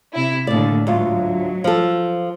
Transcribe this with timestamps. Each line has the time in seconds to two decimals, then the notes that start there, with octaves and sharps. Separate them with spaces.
0.13 C3 E4
0.47 D#2 A2 D3 D5
0.87 D2 G#2 F#3 F4
1.64 F3 A4